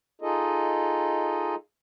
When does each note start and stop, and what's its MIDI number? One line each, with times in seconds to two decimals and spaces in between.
0.22 1.55 63
0.22 1.55 65
0.22 1.55 68
0.22 1.55 69
0.22 1.55 75